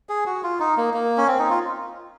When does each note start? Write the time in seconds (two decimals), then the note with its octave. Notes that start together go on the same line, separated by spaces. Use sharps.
0.09 G#4
0.26 F#4
0.43 F4
0.60 D#4
0.77 A#3
0.94 A#3
1.18 C#4
1.28 C4
1.39 D#4
1.50 F4